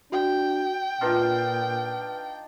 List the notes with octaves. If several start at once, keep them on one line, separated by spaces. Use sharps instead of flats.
D4 F#4 G5
A#2 D4 D#4 F4 B4 F6